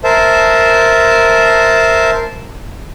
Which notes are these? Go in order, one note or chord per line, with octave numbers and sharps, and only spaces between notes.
A#4 C5 E5 A5